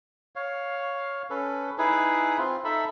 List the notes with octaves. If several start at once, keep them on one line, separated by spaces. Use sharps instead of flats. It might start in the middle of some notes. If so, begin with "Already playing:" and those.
C#5 F5
C#4 A4 B4
D#4 E4 G#4 B4
C4 F4
D#4 A4 E5 B5